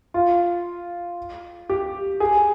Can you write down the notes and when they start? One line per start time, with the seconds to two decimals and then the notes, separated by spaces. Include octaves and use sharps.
0.14 F4
1.69 G4
2.20 G#4